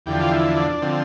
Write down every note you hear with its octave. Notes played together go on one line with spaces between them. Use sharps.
E2 D3 F3 G4
F4
E4
D4
D3 F3 C4